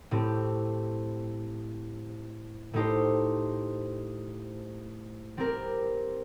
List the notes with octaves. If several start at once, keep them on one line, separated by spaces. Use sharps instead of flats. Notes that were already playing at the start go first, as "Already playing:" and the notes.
A2 A3 C4 G4
A2 A3 D#4 G4 C5
G3 C4 G4 A#4